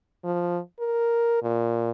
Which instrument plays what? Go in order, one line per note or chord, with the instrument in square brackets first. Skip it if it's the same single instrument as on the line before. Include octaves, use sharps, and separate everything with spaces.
[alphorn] F3
A#4
A#2